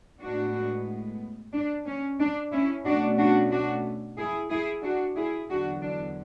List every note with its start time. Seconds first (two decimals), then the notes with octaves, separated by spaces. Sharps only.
0.21 A2 G#3 B3 D4 F#4
1.53 D4
1.86 C#4
2.20 D4
2.52 C#4 E4
2.85 B2 A3 C#4 D4 F#4
3.18 D4 F#4
3.51 D4 F#4
4.18 E4 G#4
4.50 E4 G#4
4.83 D4 F#4
5.16 E4 G#4
5.50 E2 D3 F#3 D4 F#4
5.82 D4